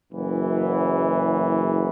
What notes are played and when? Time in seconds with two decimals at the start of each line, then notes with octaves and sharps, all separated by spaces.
0.10 F#1 F#2 E3